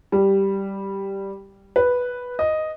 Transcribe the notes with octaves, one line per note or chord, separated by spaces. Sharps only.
G3
B4
D#5